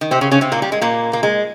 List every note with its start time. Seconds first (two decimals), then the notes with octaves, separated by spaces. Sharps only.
0.01 D#3
0.11 C3 C4
0.21 C#3 C#4
0.31 C#3 C#4
0.41 C3 C4
0.52 A#2 A#3
0.62 G3
0.72 G#3
0.82 A#2 A#3
1.13 A#3
1.23 G#3